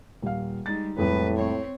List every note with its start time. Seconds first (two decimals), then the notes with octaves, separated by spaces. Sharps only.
0.22 D#1 F5
0.66 G3 G#3 D#4 A6
0.97 C2 F2 A2 G#3 B4
1.36 C4 C#5